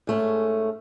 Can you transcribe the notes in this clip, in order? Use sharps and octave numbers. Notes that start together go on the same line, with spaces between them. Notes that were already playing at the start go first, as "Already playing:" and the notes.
G#2 A3 C#4